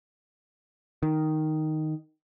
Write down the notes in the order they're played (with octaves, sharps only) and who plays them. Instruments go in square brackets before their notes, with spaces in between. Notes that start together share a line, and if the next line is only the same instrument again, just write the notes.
[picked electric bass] D#3